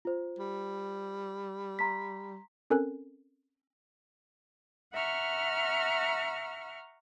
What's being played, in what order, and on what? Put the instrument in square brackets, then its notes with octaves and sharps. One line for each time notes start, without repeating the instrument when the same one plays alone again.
[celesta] F4 C5
[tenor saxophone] G3
[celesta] A#5 C6 B6
[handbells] C4 C#4 A4 A#4 G#5 F#6
[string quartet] E5 F#5 A#5 C#6 F6